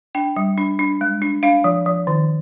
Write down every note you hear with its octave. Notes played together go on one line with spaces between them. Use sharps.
D4 G5
G3
D4
D4
G#3
D4
D4 F5
F3
F3
D#3